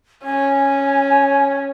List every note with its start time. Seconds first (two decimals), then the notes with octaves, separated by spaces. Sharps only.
0.25 C#4 G#5